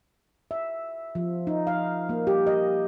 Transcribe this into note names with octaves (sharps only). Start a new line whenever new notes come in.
E5
F3
D#4
F5
A#3
G4
D#5